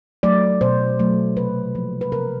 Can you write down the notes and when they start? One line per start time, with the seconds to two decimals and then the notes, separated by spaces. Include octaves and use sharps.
0.23 F#3 A3 D5
0.61 B2 C5
0.99 F#3 A3
1.37 C3 B4
1.75 F3 A#3
2.01 B4
2.12 C3 A#4